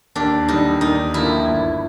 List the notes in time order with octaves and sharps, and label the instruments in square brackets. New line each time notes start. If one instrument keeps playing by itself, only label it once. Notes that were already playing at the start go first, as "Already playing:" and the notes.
[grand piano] D#2 [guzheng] D4
[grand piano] D3 G3 [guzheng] D#4
[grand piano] D#2 [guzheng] D#4
[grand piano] D3 F3 A#3 [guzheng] E4
[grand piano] G1